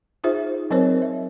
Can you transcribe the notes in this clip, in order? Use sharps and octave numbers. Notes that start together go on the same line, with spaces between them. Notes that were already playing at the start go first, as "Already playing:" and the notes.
D#4 F4 G#4 C5 E5
F#3 C4 A#4 C5 C#5
E5